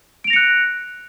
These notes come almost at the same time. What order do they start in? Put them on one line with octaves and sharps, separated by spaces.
D7 F7 A#6 C#7 F#6